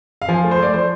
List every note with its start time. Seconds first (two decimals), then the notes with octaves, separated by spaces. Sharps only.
0.22 F5
0.29 F3 G#5
0.44 A3
0.51 C5
0.59 A3 D5
0.74 F3 C5